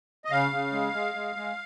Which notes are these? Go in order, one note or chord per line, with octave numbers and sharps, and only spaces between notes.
D#5
C#3 F5
C#3
G#3
G#3
G#3
G#3